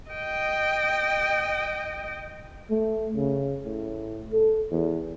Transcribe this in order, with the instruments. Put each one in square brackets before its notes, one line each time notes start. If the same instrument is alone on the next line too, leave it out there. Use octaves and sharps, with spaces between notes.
[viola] D#5 G5
[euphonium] A3
C#3
A2
A4
E2